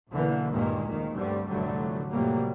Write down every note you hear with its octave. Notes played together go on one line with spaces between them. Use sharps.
B1 D3 E3 A#3
D2 G2 A#2 D#3 G#3 A#3
F2 D#3
G2 D3 G3 A3 C4
F1 A2 D3 F#3 G3 A3
F2 A2 C3 F#3 G3 A#3